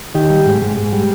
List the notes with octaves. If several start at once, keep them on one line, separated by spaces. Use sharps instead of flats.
D#3 G4
G3
G#2
G#2
G#2
G3